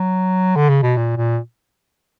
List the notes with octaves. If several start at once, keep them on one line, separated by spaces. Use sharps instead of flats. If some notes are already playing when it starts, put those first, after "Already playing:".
Already playing: F#3
D3
C#3
B2
A#2
A#2